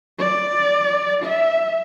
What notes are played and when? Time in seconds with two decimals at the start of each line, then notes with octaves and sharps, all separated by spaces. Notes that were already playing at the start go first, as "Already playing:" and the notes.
0.19 D5
1.22 E5